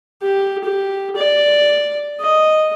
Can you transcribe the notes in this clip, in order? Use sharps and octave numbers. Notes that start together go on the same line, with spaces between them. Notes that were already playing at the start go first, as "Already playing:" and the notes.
G4
G4
D5
D#5